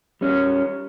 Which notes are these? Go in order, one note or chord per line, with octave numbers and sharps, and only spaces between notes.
G3 C#4